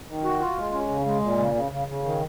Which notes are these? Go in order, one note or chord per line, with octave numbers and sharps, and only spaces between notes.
D#3
F#4
F4
G#3
C#4
C#3
G#3
A#2
C#3
C#3
C#3
C#3
D#3